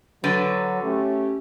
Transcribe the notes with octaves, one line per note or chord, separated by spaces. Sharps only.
D3 F#3 B4
A3 C#4 G4